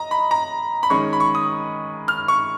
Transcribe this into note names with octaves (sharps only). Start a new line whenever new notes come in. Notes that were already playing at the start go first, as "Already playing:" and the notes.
Already playing: D#5 A#5
B5
A#5
B5
D#3 G#3 C#4 C#6
B5
C#6
D#6
F6
C#6